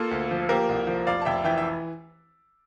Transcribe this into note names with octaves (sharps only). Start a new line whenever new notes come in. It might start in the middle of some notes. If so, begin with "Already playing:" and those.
Already playing: A#3 F4 A4
D2
F3
A#3 G4 A#4
C2
F3
F1 D5 F5
A5
F1 E5 G5
E3 E5 G5
E5